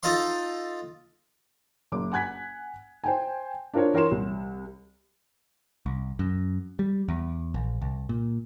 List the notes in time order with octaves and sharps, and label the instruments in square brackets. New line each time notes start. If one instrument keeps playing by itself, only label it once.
[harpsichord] D#4 F4 A4 D#5 F5 C6
[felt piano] F#1 D6
F#5 G#5 F#6 G#6 B6
C5 G5 G#5
D4 F4 A#4 C5 C#5
E3 A#4 C#5 C6 E7
C2
[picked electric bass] C2
F#2
G3
E2
A#1
C2
A#2